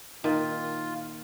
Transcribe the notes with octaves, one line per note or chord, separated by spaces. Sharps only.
A#2 D#3 F4